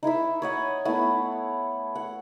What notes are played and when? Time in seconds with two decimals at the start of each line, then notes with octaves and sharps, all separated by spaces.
0.03 D#4 E4 D#5 E5
0.42 C#5 D#5 F#5
0.85 A3 B3 E4
1.95 F#5